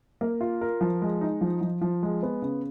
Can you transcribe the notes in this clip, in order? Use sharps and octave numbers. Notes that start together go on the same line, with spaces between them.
A#3
F4
A#4
F3
G#3
D#4
F3
F3
F3
G#3
B3
C#3